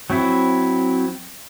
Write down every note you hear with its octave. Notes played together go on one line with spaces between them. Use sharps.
F#3 C4 E4